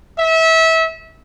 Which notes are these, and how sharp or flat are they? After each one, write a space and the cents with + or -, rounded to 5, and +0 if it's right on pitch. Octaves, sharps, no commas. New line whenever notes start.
E5 -25